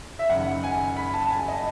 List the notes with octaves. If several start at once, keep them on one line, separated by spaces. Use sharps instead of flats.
E5
F#1 F#2 D#3 F#5
G#5
B5
A5
G#5
D#5